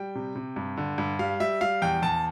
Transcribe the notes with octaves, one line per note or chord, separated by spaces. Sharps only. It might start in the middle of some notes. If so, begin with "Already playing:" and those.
Already playing: G3 G5
C3
C3
G2
D3
G2
G3 F5
G3 E5
G3 F5
E2 G5
E2 A5